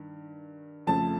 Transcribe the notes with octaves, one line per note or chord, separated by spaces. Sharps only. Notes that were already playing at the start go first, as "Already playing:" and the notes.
Already playing: G2 D#3
F2 C#3 F3 A3 A5